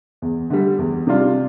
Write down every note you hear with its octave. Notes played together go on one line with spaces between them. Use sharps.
E2
D3 G3
E2
C3 G3 D4 F4